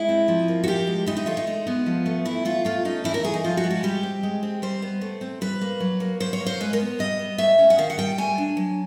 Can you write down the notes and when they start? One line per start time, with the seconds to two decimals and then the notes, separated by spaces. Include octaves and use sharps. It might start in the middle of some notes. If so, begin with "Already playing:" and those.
Already playing: G#3 E4
0.09 C4
0.28 F3
0.48 A#3
0.64 F#4
0.68 F3 G4
0.87 G#3
1.06 E3 D#4
1.17 D#4
1.26 A3 F4
1.37 D#4
1.47 G#3
1.67 B3
1.86 F3
2.06 A3
2.25 E3 E4
2.45 A3 F4
2.65 A3 F4
2.85 C#4 D#4
3.04 E3 E4
3.14 A#4
3.23 A3 G#4
3.34 D#4
3.44 F3 F4
3.57 F#4
3.64 G#3
3.71 F#4
3.83 G3 G4
4.03 C4
4.23 G#3
4.43 C4
4.62 G3 C5
4.82 B3
5.01 A3
5.21 C4
5.41 G3 B4
5.61 A#3
5.80 F#3
6.00 A#3
6.20 F#3 C5
6.33 C#5
6.40 A#3
6.46 C5
6.60 G#3 B4
6.73 A#4
6.80 B3
6.99 G3 D#5
7.19 B3
7.38 A3 E5
7.59 C#4
7.70 F#5
7.78 D#3 F5
7.90 F#5
7.98 G3 G5
8.18 A3 G#5
8.38 D4
8.57 F#3